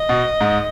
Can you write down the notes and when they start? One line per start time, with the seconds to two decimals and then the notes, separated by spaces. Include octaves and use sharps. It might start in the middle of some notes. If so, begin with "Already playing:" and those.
Already playing: D#5
0.09 B2
0.41 G#2